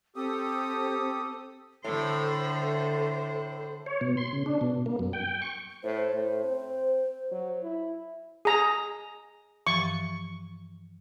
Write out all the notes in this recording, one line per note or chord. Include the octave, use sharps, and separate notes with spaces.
C4 G4 A4 D#6
A2 D3 A4 C5
C#5
B2
C6
C#3
D4
B2
A#3
F#2
G5
C#6
A2 C5
A2
C4
F#3
E4
G#4 A#5
G2 E3 F3 C#6